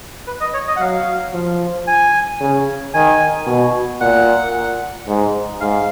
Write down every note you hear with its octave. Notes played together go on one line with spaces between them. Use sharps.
B4
D#5
C#5
D#5
F#5
F#3 F5
F3
G#5
C#3
D#3 G#5
B2
A#2 F#5
G#2
G#2 F5